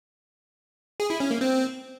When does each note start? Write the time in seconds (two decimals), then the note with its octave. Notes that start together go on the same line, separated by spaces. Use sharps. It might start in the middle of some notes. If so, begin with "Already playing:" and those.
1.00 G#4
1.10 E4
1.20 C#4
1.31 A#3
1.41 C4